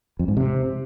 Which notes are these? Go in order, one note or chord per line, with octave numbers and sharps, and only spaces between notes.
F2
G#2
C3